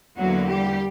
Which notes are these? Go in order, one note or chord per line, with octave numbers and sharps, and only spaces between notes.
E2 D3 F#3 A#3 F#4
G3 G4